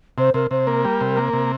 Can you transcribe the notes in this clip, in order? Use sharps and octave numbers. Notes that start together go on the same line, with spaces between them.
C3 C5
C3 A#4
C3 C5
A#3 A#4
G3
C3
A#3
C3